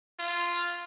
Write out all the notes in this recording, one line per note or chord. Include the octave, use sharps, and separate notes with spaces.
F4